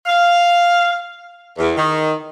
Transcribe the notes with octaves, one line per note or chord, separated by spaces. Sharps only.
F5
E2
D#3